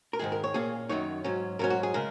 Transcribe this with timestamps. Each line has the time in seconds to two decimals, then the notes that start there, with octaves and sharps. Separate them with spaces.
0.13 A#4
0.19 G#2 D#3 G#3 G#4
0.32 A#4
0.44 C#5
0.54 A#2 A#3 C#4 G#4
0.89 F#2 D#3 F#3 D#4 C#5
1.24 G#2 F#3 C#4
1.59 G#2 F#3 C#4 A#4
1.70 F#4
1.83 G#4
1.94 C#3 G#3 A#4